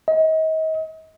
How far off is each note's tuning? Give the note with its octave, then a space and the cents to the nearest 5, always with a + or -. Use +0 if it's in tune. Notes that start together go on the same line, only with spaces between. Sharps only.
D#5 +35